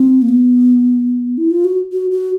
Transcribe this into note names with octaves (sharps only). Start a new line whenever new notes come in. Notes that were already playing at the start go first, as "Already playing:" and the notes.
Already playing: C4
A#3
B3
E4
F4
F#4
F#4
F#4